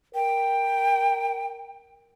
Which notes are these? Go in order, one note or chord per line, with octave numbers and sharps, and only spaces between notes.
A#4 G5